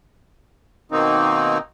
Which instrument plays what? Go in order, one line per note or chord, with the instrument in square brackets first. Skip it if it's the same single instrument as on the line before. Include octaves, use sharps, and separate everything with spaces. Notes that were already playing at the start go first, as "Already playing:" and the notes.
[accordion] B2 D#3 A#3 C4 D#4